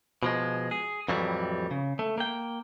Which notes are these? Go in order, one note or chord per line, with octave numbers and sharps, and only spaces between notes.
B2 F3 G#3
G#4
F2 A2 E3 F#3 G3
C#3
A3
A#3 G5